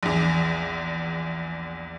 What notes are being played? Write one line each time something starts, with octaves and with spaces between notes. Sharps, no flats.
A#1 E2